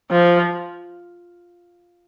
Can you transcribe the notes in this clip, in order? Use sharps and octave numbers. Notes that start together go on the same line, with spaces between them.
F3